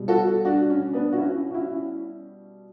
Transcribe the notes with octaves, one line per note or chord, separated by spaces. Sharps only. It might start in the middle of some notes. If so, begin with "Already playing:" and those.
Already playing: B2 G3
F#4 A4
D4 F#4
C#4
B3 D4
F#4
C#4 E4
F#4
C#4 E4